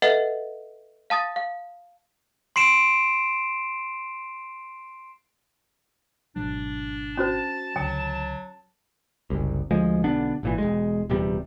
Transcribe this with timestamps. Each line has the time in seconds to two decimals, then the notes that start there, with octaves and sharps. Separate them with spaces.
0.02 A4 B4 D#5 E5 F#5
1.10 F5 A5 D#6 A6
1.36 F5
2.56 C6 C7 D7 E7
6.36 G#1 B2 F#3 D4
7.17 C#4 F#4 C5 A5
7.76 C#2 D3 F#3 G5
9.30 F#1 C2
9.71 D2 F3 G#3
10.04 B1 D3 B3 D4
10.43 G#1 A#2 E3
10.58 E1 C#2 G#3
11.10 D#1 E2 C3 G3